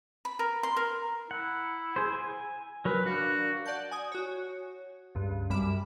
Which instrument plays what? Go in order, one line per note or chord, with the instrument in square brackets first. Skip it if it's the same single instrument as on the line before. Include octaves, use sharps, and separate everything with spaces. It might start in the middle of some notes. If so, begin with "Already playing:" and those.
[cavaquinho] B5
A#4
C6
A#4
[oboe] E4 [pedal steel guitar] F#5
[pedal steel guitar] G#4 C5
G#5
[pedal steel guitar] F#3 A#4 [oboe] B4
[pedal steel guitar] D4 A#4 F5 [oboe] F#4
[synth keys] D5 F#5 A5 G6
G#5 D#6
F#4 C#5
C#2 G2
C2 F#2 G3 B5 D6 E7